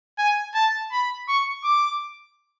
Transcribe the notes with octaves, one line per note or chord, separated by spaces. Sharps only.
G#5
A5
B5
C#6
D6